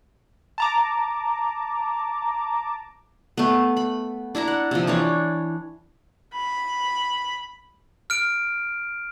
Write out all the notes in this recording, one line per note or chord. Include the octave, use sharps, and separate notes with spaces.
A5 A#5 D6
A3 B3
B5
D4 E4 E5 A#5
F#5
C3 F3
E3 D4 C#5
B5
F6 D7